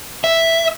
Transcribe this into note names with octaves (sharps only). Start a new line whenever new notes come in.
E5